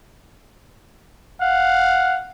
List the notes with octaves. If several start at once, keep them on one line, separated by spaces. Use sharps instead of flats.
F5 F#5